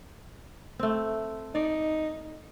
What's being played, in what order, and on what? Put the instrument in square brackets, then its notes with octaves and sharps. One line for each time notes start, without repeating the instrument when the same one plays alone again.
[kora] A3 C4
[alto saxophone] D#4 [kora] D5